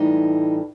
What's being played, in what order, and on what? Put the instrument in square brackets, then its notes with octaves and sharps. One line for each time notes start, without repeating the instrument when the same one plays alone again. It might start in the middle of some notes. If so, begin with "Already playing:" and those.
Already playing: [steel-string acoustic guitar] A2 E3 G3 D#4